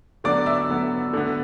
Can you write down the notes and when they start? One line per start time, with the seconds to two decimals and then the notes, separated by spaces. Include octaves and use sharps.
0.24 D3 F#3 B3 D5 D6
0.46 E5 E6
0.69 D3 F#3 B3
1.13 D3 B3